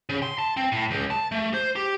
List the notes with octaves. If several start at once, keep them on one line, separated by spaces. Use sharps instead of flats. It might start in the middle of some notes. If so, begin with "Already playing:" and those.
C#3
C6
A5
C4
A2
C#2
A5
A3
C5
G4